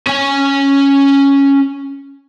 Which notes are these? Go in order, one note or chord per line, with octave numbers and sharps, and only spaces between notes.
C#4 G#5